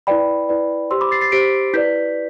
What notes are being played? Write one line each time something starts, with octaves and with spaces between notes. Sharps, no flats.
E4 B4 D5 G5 B5
E4 B4 D5
G4 C5 C6 E6
B5 D6
A6 C7
A6 C7
G4 C5 B6 D7
E4 B4 D5 G6 B6